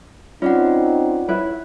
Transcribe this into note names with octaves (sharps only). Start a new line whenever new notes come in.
C4 C#4 D#4 F4 D5 F#5
E4 B4 C#5